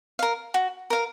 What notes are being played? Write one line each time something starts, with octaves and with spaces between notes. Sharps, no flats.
A#4 F5
F#4
A#4 F5